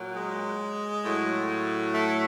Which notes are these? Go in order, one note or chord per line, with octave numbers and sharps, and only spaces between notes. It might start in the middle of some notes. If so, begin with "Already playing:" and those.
Already playing: A#2 F#3
G#3
A2 F#3
A3